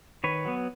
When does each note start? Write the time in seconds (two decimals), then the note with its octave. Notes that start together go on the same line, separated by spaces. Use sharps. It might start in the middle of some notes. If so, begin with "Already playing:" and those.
0.24 D#3 B4 C#5
0.45 F#3 B3